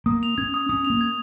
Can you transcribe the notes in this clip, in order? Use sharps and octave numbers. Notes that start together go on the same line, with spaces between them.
A#3 D#6
F7
C#4 G#6
D#6
C#4 D#6
F7
A#3
G#6